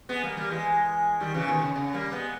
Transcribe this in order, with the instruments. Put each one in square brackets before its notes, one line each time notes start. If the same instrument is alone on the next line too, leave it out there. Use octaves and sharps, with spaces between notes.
[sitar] G#3 B3
G3 A#3
G3 A#3
E3 G#3
D#3 G3
C#3 E3
B2 D#3
C#3
C#3
G3 A#3
G#3 B3